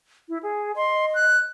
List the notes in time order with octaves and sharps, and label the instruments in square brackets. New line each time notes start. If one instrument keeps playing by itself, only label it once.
[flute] E4
G#4
[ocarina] D#5 [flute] C6
[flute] F#6